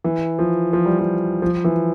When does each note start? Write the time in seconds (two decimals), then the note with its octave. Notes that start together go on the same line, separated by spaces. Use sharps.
0.04 E3
0.39 F3
0.73 F3
0.86 G3
0.99 F3
1.42 F3
1.64 E3